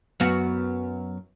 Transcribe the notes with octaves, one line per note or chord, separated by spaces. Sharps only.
F#2 B3 F#4